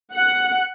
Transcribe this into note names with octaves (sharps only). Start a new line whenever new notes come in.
F#5